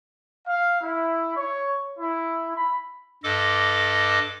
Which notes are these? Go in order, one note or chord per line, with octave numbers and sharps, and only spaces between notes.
F5
E4
C#5
E4
B5
G2 A4 D#5 D6